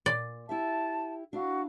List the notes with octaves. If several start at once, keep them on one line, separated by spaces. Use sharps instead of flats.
A#2 D5
E4 G4 E5 A5
D4 E4 F#4 F5